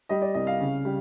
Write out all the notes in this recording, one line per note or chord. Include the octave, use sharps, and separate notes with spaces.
G3 D#5
D5
C2 D#5
F5
C#3
G3